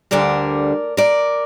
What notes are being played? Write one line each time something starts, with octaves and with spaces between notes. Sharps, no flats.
D2 D3 G3 A#4 D5
A#4 D5